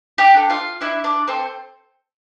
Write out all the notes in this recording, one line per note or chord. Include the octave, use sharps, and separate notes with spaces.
G4 G5
D4 A4
F4 F5
D4 E4 E5
D4 D5
C4 A4 C5